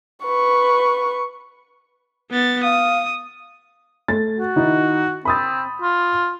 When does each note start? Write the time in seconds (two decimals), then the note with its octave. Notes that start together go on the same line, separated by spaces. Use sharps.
0.25 B4 C#6
2.31 B3 A6
2.63 F5 D#6
4.08 A3 A6
4.39 F#4
4.56 D#3 D#4 E4
5.25 C4 B5 D#6 A6
5.82 F4